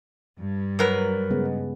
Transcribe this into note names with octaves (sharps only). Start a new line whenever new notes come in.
G2
F#3 A#4 B4
C#3 G#3 B3